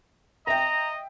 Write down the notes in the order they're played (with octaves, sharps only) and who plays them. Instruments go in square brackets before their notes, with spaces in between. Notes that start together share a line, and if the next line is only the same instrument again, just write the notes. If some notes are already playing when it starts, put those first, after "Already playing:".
[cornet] D#5 [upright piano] E5 G5 [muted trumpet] A#5